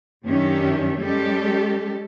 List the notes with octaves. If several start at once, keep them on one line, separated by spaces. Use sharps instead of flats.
F#2 D#3 C#4 D4 G4 E5
G3 G#3 C#4 G4 A4